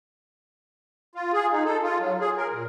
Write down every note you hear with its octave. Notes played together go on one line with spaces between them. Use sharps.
F4
G#4
D#4
A4
F4
F#3
G#4
A#4
A#2